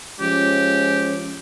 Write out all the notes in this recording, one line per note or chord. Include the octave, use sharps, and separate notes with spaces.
F3 G#3 C#4 G4